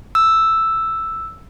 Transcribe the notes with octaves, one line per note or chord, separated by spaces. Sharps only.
E6